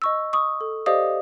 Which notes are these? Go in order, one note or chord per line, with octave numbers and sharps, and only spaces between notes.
D#5 C#6 E6
C#6 D#6
A4
G4 C5 D5 D#5 F5 D#6